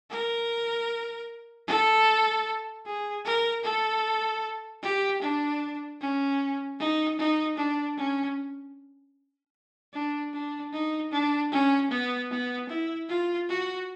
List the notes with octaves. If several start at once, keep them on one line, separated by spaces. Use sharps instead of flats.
A#4
A4
G#4
A#4
A4
G4
D4
C#4
D#4
D#4
D4
C#4
D4
D4
D#4
D4
C#4
B3
B3
E4
F4
F#4